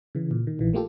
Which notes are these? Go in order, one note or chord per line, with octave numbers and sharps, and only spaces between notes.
C#3 E3
A#2
D#3
A#1 E3
A3 A#3 F4 G4 A4